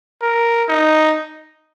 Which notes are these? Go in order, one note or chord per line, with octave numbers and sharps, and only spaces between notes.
A#4
D#4